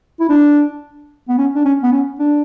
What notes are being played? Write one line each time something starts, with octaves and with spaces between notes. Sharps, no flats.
E4
D4
B3
C#4
D4
C#4
B3
C#4
D4